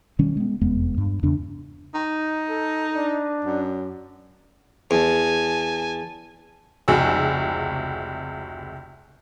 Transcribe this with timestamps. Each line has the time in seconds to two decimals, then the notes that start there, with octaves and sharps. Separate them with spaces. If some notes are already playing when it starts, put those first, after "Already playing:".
0.19 B2 D#3 G3 C#4
0.37 G#3 B3
0.61 F1 E2 G#3 B3
0.98 G2
1.23 E2 C#3 D4
1.95 D#4
2.49 A4
2.96 D4
3.45 F#2
4.91 E2 G#5 A5
6.88 F1 C#2 C3 F#4 G#4 E6